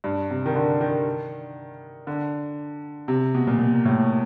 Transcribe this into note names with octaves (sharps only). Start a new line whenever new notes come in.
G2
C3
D#3
D3
D#3
D3
C3
B2
A#2
A#2
A2